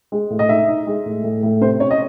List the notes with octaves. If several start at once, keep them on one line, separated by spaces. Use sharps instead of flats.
G#3
A2
D#5
D#4 E5
D#4
G#3
A2
A2
A2
C3 C5
C#4 C#5
D#5